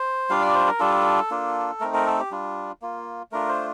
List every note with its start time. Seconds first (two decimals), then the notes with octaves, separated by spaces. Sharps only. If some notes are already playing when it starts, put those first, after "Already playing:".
Already playing: C5
0.30 G3 D4 F4 F5
0.41 D5
0.55 C5
0.68 A#4
0.80 G3 D4 F4 A4
1.31 A#3 D4 F4
1.80 A3 C4 D#4 A#4
1.94 A#4
2.07 A4
2.19 G4
2.31 G3 D4 F4
2.82 A#3 F4
3.32 A3 D4 F4 A#4
3.49 C5